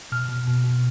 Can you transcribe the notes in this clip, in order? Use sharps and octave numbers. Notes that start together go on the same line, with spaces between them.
B2 F6
B2
B2
B2